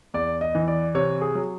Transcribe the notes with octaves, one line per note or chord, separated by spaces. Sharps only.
E2 D5
D#5
E3
D5
C3 C#5
G#4
F#3